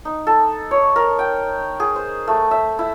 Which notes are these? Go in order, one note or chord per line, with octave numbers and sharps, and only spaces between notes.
D#4
A4
C#5
A#4
G5
G#4
C5
A3
E5
E4